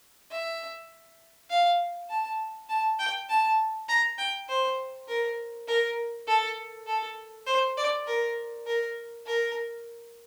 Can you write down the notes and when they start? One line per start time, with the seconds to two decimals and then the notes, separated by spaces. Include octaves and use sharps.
0.30 E5
1.50 F5
2.09 A5
2.69 A5
2.99 G5
3.29 A5
3.89 A#5
4.18 G5
4.48 C5
5.08 A#4
5.68 A#4
6.27 A4
6.87 A4
7.46 C5
7.77 D5
8.07 A#4
8.67 A#4
9.26 A#4